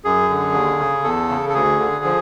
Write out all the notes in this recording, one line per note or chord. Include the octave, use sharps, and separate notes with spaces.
F#2 G#4
D3
D#2
C#3
E2 A4
C#3
A4
D2 G#4
D3
F3